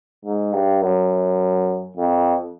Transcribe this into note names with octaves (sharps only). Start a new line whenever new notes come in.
G#2
G2
F#2
F2